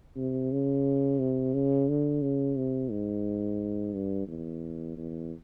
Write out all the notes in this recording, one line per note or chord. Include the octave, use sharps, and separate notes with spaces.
C3
C#3
C3
C#3
D3
C#3
C3
G#2
G2
E2
E2